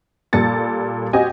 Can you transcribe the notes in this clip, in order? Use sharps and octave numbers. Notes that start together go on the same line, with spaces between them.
A#2 G3 A4 A6 C#7
C4 F#4 G4 D#5 G#5